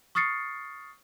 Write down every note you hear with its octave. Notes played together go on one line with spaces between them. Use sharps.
C#6 D#6 F6 A6 C7 C#7